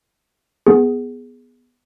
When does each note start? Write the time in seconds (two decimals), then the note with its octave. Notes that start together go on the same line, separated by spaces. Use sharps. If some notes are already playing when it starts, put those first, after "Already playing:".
0.67 B3 G#4